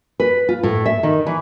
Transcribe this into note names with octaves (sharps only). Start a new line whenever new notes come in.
B4
F4
A2
E5
D#3
E3